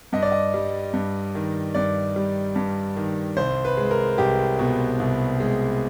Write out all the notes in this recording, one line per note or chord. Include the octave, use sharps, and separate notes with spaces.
G2 D#5
D5
D#5
G3
G2
D#3
G2 D5
G3
G2
D#3
C2 C5
B4
G#3
A#4
C2 G4
B2
C2
G#3